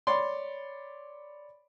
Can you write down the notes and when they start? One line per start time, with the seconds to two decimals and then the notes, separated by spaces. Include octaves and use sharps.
0.07 C#5 D5 B5 C6